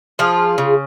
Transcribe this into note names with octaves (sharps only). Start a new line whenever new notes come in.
F3 F4 G#4
C#3